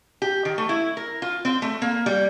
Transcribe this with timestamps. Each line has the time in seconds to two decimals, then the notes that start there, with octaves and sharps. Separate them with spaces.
0.22 G4
0.45 D#3
0.58 A3
0.69 E4
0.97 A#4
1.22 F4
1.45 C4
1.62 A3
1.82 A#3
2.06 G3